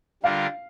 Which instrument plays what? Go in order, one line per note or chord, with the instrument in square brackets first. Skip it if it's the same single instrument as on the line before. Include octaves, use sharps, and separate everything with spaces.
[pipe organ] D3 G3 D4 F4 A#4 [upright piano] F5